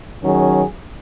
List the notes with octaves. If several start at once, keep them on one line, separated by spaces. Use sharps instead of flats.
D#3 F#3 C#4 G#4